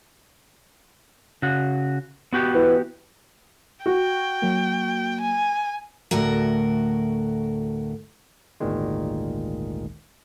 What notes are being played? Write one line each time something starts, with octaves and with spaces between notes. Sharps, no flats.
C#3 F#4
B3 F#4 G4
E3
F#4 G5
F#3 A#3
G#5
D2 A2 F#4 A#4
G#1 D2 A#2 D#3 G#3